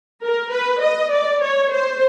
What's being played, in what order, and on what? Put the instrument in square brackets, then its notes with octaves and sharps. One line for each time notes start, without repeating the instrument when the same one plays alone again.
[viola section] A#4
B4
D#5
D5
C#5
C5